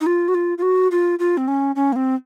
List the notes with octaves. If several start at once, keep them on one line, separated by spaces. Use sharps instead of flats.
D#4
F4
F#4
F4
F4
F#4
F4
F4
C4
C#4
C#4
A#3
C4